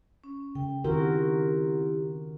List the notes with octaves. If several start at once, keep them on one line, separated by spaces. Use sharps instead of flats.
C#4
C#3 G5
D#3 C4 E4 F#4 G4 A#4